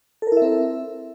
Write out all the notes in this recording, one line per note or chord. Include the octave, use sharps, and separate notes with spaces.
C4 E4 A4 A#4 E5